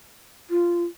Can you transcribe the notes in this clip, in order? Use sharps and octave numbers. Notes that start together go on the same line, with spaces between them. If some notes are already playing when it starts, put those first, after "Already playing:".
F4